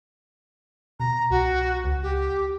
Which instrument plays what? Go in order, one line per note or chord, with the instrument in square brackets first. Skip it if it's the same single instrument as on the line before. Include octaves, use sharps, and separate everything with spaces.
[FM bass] B2 [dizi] A#5
[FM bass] C2 [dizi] F#4
[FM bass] C#2
[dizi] G4